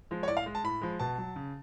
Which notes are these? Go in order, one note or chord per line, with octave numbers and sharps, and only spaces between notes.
F3 G#3
C#5
A2 D5
F5
G#3
A5
A2 B5
F3 G#3
B2 A5
F#3
C#3